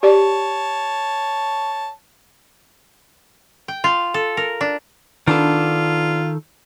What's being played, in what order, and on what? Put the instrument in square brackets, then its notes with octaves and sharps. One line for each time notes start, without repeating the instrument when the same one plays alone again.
[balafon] G4 D5 [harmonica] C#5 A5
[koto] G5
F4
A4
A#4
D4
[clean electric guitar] D#3 A4 [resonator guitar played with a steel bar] B3 D4 [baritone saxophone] F4